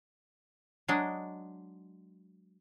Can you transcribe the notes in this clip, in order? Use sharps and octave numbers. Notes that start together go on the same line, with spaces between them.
F#3 G#3 D4 D#5